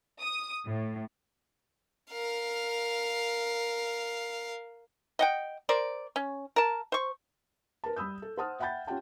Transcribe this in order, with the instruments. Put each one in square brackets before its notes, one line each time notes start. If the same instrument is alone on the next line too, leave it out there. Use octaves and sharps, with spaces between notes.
[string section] D#6
A2
[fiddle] A#4 F5
[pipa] D#5 F#5 G5
A#4 C5 D5
C#4
A#4 A5
C5 C#6
[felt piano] A#4 B4 A5
G3 B5 D#6 E6 G6
A4
C5 F#5 A5 D#6 F6
E5 F#5 G5 B5 G6 A6
C#4 F4 G4 F#5 G5 A5